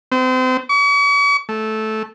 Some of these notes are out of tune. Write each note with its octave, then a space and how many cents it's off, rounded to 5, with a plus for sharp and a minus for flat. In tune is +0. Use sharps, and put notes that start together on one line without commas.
C4 -35
C#6 +45
A3 -10